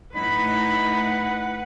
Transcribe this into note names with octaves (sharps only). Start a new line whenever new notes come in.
A2 D#4 E4 B4 F#5 B5